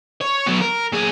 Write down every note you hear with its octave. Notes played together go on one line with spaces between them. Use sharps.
C#5
F#3 B3
A#4
A#2 G#4